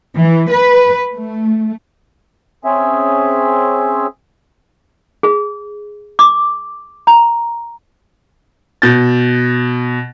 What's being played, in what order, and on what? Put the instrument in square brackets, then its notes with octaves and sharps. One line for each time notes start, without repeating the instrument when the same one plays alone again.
[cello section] E3
B4
A3
[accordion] C4 C#4 G#4 E5
[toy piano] G#4
D6
A#5
[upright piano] B2 G6 A6